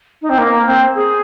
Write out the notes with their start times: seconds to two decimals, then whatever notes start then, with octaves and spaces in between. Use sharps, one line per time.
0.22 D#4
0.30 C4
0.38 A#3
0.66 C4
0.95 G#4